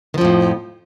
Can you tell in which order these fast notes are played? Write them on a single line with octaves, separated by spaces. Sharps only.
D#3 F3 F2 A2